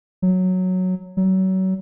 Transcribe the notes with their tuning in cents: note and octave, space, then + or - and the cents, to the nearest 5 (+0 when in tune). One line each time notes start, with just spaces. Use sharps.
F#3 -5
F#3 +30